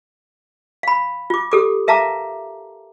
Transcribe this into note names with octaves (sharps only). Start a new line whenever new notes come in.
F5 B5
F4 D6
G4 A4 D6
A#4 E5 F5 A5 A#5 D6